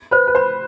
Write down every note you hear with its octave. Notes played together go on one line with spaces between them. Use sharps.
B4 C5
B4
C5 B5